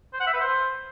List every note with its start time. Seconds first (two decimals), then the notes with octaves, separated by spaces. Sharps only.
0.13 C5
0.20 F#5
0.27 E5
0.34 B4
0.40 C5